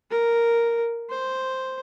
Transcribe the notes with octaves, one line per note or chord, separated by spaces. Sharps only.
A#4
C5